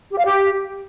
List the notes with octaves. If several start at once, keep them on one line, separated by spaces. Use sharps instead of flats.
G4
F5
G4